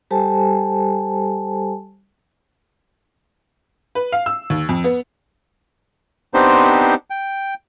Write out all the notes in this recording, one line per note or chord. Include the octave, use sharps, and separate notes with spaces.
G3 G4 A4 C5 G#5 A5
B4
F5
E6
D#2
F2
B3
B3 C4 D4 D#4 G4 C5
G5